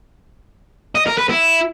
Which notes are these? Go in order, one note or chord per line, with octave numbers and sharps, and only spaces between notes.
D#5
A#4
B4
E4